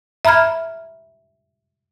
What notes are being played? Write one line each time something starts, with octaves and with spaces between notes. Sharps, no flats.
E5 A#5 B5 F6 G#6